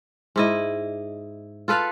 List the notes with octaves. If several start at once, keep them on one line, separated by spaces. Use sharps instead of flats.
G#2 E4 D#5
F4 A4 B4 F5